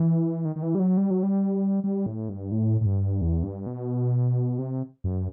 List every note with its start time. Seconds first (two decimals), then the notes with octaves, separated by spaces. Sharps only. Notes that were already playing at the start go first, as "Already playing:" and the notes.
Already playing: E3
0.45 D#3
0.56 D#3
0.62 E3
0.75 G3
0.79 F#3
0.97 G3
1.10 F#3
1.23 G3
1.84 G3
2.06 A2
2.29 G2
2.52 A2
2.81 A2
2.86 G2
3.21 E2
3.43 G2
3.66 B2
4.59 C3
5.04 F#2